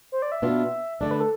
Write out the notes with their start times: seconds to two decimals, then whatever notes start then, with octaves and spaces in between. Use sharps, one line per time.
0.12 C5
0.22 D5
0.32 E5
0.42 B2 B3 D4 F4
1.00 D3 A3 D4 D5
1.11 B4
1.20 A4